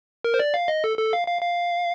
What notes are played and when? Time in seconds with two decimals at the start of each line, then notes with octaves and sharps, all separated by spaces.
0.24 A#4
0.34 C5
0.40 D5
0.54 F5
0.68 D#5
0.84 A4
0.98 A4
1.13 F5
1.27 F5
1.42 F5